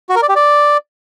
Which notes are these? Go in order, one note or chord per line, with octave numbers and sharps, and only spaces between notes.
F#4
A#4
D5
G4
D5